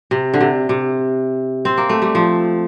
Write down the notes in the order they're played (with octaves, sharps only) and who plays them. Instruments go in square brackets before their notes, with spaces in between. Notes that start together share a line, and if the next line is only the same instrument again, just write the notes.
[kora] C3
D3
C3
C3
C4
A#3
A3
G3
F3